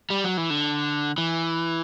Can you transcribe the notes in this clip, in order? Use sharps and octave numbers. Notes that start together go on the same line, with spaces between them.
G3
F#3
E3
D3
E3